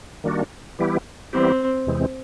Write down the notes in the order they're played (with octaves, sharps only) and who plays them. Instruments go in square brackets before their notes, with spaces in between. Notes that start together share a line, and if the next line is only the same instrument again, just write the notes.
[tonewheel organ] D#3 G3 A#3 D4 F#4
E3 G3 B3 E4 G4
[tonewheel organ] E3 G3 B3 E4 G4 [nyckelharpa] C4
[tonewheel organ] E2 C3 E3 G#3 C4